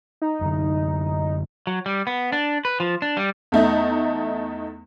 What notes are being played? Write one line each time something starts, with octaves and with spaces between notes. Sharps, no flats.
D#4
F#2 D3
F#3
G3
B3
D4
B4
F3
D4
G3
E2 A3 D#4